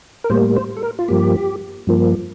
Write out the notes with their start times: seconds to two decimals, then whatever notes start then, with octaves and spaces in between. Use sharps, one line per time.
0.24 A#4
0.30 A2 G3 A#3 C5
0.56 C5
0.77 A4
0.83 A#4
0.99 F4
1.08 G2 F3 A#3 G4
1.87 G2 F3 A#3